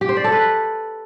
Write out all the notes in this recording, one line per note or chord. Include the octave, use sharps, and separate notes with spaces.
G4
C5
D5
A4
B4